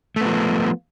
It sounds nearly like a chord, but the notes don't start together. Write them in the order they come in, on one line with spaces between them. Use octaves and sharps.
A3 B3 F3